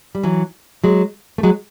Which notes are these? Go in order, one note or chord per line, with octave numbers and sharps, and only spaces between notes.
G3
E3 F#3
F#3 G#3
A3
F#3 G#3